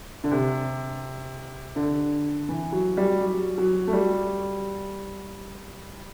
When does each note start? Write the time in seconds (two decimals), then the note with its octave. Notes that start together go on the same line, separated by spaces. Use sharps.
0.24 D3
0.31 C3
1.76 D3
2.49 E3
2.72 F#3
2.97 G3
3.20 F#3
3.58 F#3
3.87 A3
3.93 G3